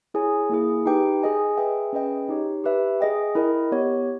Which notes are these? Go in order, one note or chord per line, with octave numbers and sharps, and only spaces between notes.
E4 G#4 C#5 G#5
A#3 E4 G#4
D#4 G4 B4 G5
G#4 D#5 G#5
G#4 B4 E5 G5
C#4 G#4 B4 D#5 G5
D#4 G4 C#5
G4 B4 E5
G#4 D#5 G5
E4 A#4 D#5 G5
B3 G4 C#5